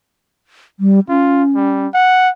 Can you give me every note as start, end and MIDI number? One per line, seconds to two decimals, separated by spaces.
0.80 1.00 55
1.09 1.87 61
1.09 1.43 65
1.55 1.88 55
1.94 2.29 78